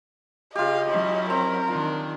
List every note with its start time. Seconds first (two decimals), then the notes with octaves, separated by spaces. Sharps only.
0.55 C#3 F4 G4 D#5 F5
0.87 F#3 C#4 E4
1.30 C4 A#4
1.68 D#3 D4 F4